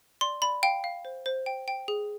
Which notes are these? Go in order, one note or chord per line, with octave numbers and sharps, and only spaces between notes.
D5 C6
D5 B5
F5 G5
F5
C5
C5
G5
G5
G#4